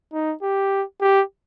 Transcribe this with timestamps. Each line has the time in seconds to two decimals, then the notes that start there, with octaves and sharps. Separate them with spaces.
0.13 D#4
0.42 G4
1.01 G4